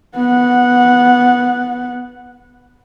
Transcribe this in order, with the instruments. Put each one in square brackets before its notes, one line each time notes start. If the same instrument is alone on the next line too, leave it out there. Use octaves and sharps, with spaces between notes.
[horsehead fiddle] B3 F#5